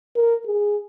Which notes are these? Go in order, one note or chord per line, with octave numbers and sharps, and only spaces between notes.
A#4
G#4